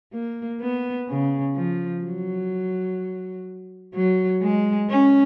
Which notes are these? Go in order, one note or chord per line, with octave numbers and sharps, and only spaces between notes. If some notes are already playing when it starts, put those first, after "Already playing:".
A#3
B3
C#3
F3
F#3
F#3
G#3
C#4